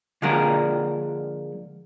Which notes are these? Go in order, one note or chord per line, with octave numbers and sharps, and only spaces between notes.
D3 F3 G#3 A#3 D4 A#4